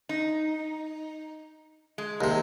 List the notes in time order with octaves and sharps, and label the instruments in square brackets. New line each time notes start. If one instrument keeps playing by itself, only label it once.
[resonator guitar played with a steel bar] D#4
G#3
[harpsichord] D#2 C3